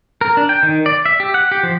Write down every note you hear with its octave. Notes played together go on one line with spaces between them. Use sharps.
A#4
D4
G5
D#3
D5
E5
G4
F#5
G4
F3